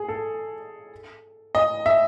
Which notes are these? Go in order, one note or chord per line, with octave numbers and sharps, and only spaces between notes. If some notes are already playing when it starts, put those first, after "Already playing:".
Already playing: G#4
A4
D#5
E5